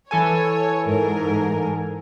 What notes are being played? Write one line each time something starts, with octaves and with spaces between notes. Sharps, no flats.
E3 A4 C#5 G#5
G#2 A#4